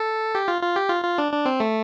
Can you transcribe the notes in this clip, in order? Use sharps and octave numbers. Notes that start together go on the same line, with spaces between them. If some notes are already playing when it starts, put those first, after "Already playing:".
Already playing: A4
G4
F4
F4
G4
F4
F4
D4
D4
C4
A3